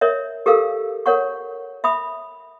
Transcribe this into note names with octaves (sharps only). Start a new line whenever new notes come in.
A#4 C#5 D#5 E5
G4 A4 A#4 F5 E6
A#4 C#5 F#5 C#6
E5 B5 D#6